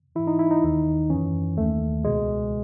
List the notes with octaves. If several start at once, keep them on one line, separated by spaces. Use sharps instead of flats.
G#2 E3 E4
D#4
E4
D#4
D#2 D#3
F#2 E3 C#4
D#2 D#3 A3
C#2 B2 G#3